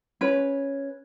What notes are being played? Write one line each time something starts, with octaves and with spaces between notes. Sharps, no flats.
C#4 B4